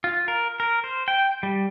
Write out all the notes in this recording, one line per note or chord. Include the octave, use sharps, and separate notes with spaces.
F4
A#4
A#4
C5
G5
G3